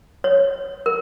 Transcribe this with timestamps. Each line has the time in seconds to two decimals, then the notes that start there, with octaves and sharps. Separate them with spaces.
0.24 C#5
0.86 A#4